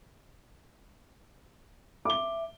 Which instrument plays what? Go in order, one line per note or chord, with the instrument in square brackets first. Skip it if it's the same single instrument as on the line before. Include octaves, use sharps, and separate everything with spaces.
[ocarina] E5 [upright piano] D6 G7